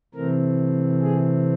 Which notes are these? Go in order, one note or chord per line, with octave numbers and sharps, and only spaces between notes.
C3 E3 A3 C4 A#4
G#4